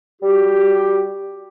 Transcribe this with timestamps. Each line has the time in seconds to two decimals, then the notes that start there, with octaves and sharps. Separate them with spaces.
0.21 G3 F#4 G4